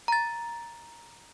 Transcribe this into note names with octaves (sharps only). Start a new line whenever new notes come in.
A#5 A6